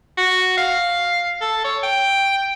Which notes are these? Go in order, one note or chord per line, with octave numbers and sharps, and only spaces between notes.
F#4
F5
A4
C#5
G5